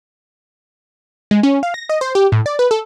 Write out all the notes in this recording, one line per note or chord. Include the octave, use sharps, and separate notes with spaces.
G#3
C#4
F5
A#6
D#5
C5
G4
A2
D5
B4
A4